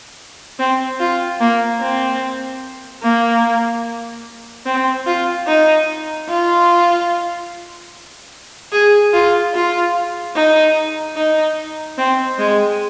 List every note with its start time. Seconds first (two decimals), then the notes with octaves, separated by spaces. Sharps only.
0.59 C4
1.00 F4
1.40 A#3
1.81 C4
3.03 A#3
4.66 C4
5.06 F4
5.47 D#4
6.29 F4
8.72 G#4
9.13 F4
9.54 F4
10.36 D#4
11.17 D#4
11.98 C4
12.39 G#3